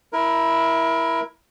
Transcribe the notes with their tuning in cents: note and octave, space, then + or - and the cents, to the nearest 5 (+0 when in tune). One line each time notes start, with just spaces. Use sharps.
E4 +0 A#4 +20